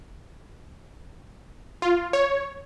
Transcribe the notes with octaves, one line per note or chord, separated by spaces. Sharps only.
F4
C#5